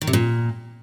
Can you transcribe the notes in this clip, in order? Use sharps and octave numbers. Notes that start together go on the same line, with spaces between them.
D#3
C3
A#2